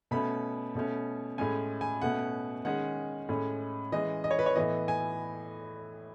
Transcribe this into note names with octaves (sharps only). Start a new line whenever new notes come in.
B2 A3 C#4 B5
B2 A3 C#4
A2 G#3 C#4 G#5
G#5
B2 A3 C#4 F#5
D#3 G#3 C#4 F#5
A2 G#3 C#4
E3 G#3 C#4 D#5
D#5
C#5
B4
C#5
A2 E3 B3 D#5
G#5